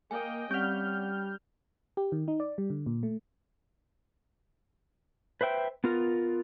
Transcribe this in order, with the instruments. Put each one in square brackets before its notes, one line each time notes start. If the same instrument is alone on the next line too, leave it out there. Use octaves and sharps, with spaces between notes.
[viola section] A#3 D#5 G5 [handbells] G#5
[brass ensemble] G3 [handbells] C4 F#5 [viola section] C#4 [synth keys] F6 G6
[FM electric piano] G4
D#3
D#4
D5
G3
D3
A#2
A3
[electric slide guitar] B4 C5 E5 G5
B3 F4 A#4